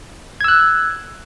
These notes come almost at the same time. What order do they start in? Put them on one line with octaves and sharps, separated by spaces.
G#6 E6 F#6